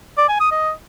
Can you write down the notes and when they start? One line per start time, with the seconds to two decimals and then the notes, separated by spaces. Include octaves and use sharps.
0.18 D5
0.29 G#5
0.40 D#6
0.51 D#5